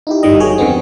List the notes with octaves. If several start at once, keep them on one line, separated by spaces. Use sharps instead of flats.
D#4 E4 G4
G1 G#2 D#3 G3 D#5
F#3 G#4 C#5
F2 D3 B3 C4